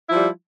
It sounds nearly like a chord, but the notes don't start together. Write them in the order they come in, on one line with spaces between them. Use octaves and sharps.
E4 F3 G3